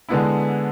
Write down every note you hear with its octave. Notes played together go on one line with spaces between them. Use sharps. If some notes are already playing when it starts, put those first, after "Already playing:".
D3 G#3 B3 E4